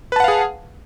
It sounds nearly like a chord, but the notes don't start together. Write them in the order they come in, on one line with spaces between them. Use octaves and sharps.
B4 A5 F#5 F5 G#4